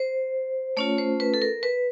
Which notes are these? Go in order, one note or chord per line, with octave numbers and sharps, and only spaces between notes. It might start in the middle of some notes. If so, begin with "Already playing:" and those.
Already playing: C5
A3 C#4 F4 C#5
C5
B4
A4
A#4
B4